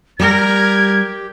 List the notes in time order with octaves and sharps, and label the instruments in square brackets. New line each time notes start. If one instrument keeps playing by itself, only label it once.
[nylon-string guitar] G3 [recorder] G4 [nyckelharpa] A#4 [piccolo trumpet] G#6